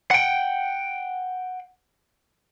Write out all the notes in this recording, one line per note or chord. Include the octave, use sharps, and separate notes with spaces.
F#5 G5